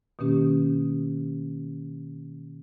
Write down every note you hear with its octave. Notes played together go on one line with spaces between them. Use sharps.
B2 D#3 A#3 C#4 G4